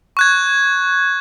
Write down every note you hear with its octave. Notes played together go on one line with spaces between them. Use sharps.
C#6 F#6 G#6